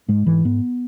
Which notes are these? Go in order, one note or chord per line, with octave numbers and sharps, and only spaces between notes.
G#2 G#3
G#2 E3
G#2 B3